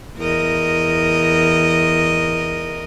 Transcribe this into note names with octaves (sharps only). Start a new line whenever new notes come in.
E2 A#4 D#5